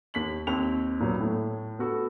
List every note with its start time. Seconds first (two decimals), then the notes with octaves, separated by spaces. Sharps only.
0.14 D#2 B6 F#7
0.47 D#2 C4 F7
1.00 A#2 F#3 B3
1.20 A2
1.79 B3 F#4 A4